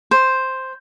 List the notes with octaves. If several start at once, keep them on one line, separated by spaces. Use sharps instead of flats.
C5